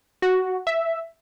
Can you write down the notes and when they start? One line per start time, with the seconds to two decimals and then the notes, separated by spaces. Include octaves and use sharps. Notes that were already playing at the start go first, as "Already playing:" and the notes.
0.22 F#4
0.67 E5